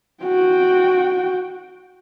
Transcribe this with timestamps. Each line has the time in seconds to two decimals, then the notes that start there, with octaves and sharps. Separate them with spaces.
0.24 F#4 G5